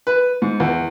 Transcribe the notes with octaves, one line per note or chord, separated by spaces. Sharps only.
B4
G#2
E2